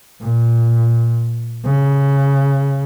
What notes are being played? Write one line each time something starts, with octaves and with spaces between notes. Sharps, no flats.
A#2
C#3